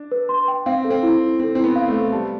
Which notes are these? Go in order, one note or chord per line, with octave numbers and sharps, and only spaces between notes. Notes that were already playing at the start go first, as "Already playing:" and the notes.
Already playing: D4
B4
C6
G5
C4 F5
A4
C4
E4
E4
C4 A4
C4 E4
B3
F5
A3
A4
G3 A5